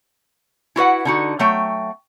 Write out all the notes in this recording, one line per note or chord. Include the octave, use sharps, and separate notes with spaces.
E4 F#4 B4 F#5
D3 D#4 F#4
F#3 A3 G5